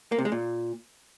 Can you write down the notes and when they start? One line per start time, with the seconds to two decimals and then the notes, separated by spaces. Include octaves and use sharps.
0.12 A#3
0.18 C3
0.25 G#3
0.32 A#2